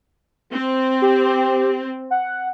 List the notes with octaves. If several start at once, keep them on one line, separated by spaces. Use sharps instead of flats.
C4
G4
F#5